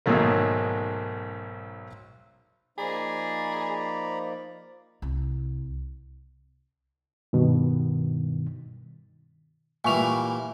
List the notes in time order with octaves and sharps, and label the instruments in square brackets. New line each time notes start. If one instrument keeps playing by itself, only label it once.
[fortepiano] B1 G#2 D#3 F#3 A3 A#3
[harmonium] F3 A#3 D#4 [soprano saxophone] G#4 [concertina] D5 A#5 B5
[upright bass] C2
[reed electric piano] G2 B2 D#3
[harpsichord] A#2 E3 G3 [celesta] G#5 C#6 F7